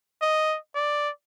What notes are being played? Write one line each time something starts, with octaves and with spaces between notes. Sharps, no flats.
D#5
D5